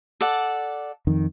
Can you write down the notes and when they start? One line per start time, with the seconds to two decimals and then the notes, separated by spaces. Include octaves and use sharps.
0.21 A4 D5 F#5
1.07 F2 D#3